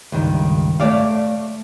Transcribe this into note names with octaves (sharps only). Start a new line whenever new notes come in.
C#2 G2 D#3
A3 C#5 D5 F5